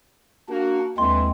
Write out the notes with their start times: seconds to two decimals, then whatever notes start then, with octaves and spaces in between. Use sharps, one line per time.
0.49 A#3 D4 F#4
0.98 D#2 D3 E3 G#3 C4 C6